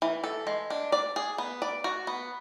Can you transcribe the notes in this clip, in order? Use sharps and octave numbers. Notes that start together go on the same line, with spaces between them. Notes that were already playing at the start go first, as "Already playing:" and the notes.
E3
A4
G#3
D4
D5
G#4
B3
D5
F#4
B3